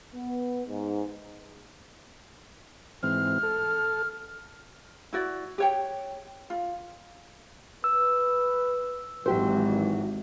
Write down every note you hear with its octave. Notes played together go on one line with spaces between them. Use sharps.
B3
G#2
G#2 E3 C4 F6
A4
E4 F#4 D5
G4 C#5 G5
F4
B4 E6
G#1 E3 F#3 G4 C5